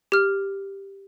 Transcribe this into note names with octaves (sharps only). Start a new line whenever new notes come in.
G4 F6